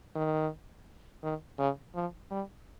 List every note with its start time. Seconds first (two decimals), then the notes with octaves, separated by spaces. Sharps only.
0.15 D#3
1.23 D#3
1.58 C#3
1.95 F3
2.31 G3